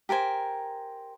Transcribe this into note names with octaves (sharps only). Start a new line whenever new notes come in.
G4 A#4 C5 G#5